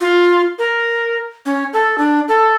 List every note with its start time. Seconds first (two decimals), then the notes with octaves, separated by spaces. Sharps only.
0.01 F4
0.59 A#4
1.46 C#4
1.73 A4
1.98 D4
2.28 A4